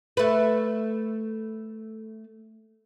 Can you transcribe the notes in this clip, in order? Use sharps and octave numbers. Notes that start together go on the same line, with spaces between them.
A3 B4